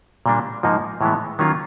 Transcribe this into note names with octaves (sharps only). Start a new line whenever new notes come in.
A#2 G3 A#3 D4
G#2 F3 A#3 D#4
A2 E3 G#3 B3
D#3 F#3 A#3 C#4 F4